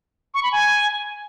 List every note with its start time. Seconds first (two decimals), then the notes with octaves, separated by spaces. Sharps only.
0.34 C#6
0.43 B5
0.52 G#5